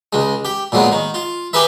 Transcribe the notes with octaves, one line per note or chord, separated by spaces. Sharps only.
C#2 G#3
G4
A#2 F#3 G#3 B3
D#3
F4
G4 G#4 A#4 B4 E5